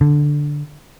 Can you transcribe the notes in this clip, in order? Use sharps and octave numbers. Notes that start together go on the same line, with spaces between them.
D3